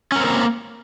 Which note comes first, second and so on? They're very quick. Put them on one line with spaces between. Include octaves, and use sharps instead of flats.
C#4 A#4 C4 A#3